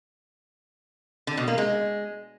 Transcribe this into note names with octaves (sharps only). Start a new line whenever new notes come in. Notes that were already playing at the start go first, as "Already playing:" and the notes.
D3
B2
A#3
G#3